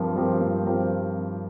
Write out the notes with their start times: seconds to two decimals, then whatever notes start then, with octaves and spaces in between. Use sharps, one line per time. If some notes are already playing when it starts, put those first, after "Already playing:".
Already playing: G2 F3 C4 G4 A#4
0.16 F3 C4 G4 A#4
0.41 G2
0.66 F3 C4 G4 A#4